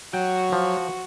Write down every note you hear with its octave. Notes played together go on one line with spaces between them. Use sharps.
F#3 F#4 G5
F3